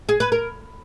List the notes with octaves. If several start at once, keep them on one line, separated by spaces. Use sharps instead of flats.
G#4
B4
A#4